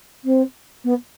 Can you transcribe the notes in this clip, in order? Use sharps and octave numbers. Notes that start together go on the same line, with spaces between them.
C4
B3